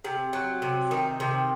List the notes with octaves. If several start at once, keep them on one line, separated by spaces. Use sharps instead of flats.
C3
F#3
C3
D#3
C3